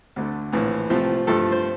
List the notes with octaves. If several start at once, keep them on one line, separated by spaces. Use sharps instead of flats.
D2 D3 A3
A#1 A2 E3
C2 C3 F3 A3
G2 F3 A3 A4
C5